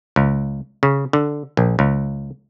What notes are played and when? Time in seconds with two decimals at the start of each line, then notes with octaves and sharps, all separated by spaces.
0.16 C#2
0.83 C#3
1.13 D3
1.57 A#1
1.79 C#2